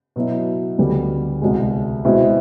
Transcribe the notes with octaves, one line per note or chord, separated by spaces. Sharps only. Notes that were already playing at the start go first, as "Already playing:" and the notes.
B2 F#3 B3 E4
D2 D3 G3 B3
C2 B2 G#3
B2 G#3 C4 E4